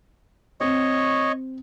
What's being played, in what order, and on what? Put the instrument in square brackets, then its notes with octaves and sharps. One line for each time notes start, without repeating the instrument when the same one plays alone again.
[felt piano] C4 [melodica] C#5 D#5 C#6